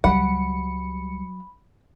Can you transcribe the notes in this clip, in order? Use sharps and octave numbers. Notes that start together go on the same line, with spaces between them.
C#2 F#3 G3 F#5 B5 C#7